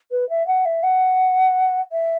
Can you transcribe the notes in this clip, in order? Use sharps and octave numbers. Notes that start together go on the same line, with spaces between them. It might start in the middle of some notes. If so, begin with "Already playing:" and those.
B4
E5
F#5
E5
F#5
E5